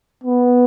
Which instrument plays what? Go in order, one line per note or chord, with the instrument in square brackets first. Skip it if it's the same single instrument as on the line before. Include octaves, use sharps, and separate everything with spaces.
[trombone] B3